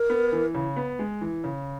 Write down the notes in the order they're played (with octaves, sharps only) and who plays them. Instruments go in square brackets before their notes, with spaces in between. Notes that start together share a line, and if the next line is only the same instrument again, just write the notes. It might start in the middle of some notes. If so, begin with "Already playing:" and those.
Already playing: [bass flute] A#4
[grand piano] B3
E3
C#3
B3
G#3
E3
C#3